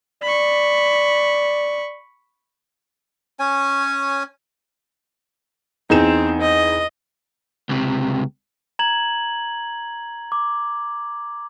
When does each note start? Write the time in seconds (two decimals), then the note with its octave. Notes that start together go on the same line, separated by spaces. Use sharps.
0.23 D5 B5 C#6
3.39 C#4 C#5 G#5
5.90 E2 C4 D#4 G#4 E7
6.40 D#5
7.69 C#2 C3
8.79 A#5 G#6 F#7
10.32 D6